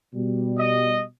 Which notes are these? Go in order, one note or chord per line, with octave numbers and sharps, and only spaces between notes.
B2 G3
D#5